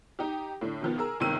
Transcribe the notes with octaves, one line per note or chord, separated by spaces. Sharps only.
D#4 G4
A2 D3
B2 D#3 F3 B3
G#4 A#4 E6
G1 C#2 C3 D#3 E6 D#7